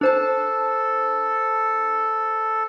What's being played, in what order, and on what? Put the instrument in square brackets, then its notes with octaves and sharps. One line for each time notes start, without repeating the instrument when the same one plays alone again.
[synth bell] D4 C5 A5 [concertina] A4